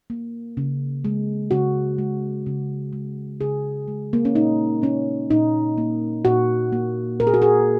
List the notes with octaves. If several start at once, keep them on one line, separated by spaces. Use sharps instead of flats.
A#3
C#3
G#3
C#3 F#4
G#3
C#3
G#3
C#3 G#4
G#3
A#3
C#4
A#2 D#4
A#3 C#4
A#2 D#4
A#3
A#2 F#4
A#3
A#2 A#4
G#4
F#4
G#4